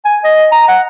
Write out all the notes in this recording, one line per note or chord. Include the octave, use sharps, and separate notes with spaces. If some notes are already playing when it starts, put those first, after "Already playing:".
G#5
D#5
A#5
F#5